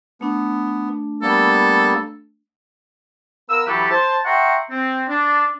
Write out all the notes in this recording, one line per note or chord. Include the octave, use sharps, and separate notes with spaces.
A3 B3 D4
G3 A#3 B3 A4
B3 A#4 F5 E6
E3 F#3 E4 G4 A4 B4
C5 A5
E5 F#5 G5 A#5 C6 C#6
C4
D4